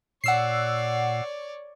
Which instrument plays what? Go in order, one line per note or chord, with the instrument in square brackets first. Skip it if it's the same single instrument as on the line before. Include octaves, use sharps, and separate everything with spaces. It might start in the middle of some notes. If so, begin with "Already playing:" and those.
[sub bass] A#2 [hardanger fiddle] C#5 D5 [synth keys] F#5 E6 C7